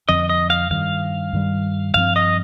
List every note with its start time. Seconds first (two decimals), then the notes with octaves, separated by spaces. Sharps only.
0.08 F2 D3 F3 C4 D#5
0.29 D#5
0.50 F5
0.71 G2 D#3 G3 F5
1.33 G2 D#3 G3
1.94 G2 F3 C4 F5
2.16 D#5